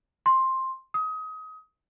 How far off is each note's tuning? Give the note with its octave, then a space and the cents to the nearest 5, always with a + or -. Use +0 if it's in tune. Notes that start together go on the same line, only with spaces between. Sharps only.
C6 +10
D#6 +25